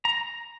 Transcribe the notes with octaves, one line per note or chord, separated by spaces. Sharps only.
A#5